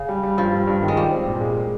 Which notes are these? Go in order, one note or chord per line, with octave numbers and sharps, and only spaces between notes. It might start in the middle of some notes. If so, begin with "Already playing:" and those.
Already playing: C#3
G3
G3
G2 F3
G3
G2
D#3
G#3
G3 F4
C4
A#2
G#3
G#3